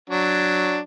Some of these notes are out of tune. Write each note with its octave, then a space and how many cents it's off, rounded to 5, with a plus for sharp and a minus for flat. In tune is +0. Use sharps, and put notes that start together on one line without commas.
F#3 +0 D4 +0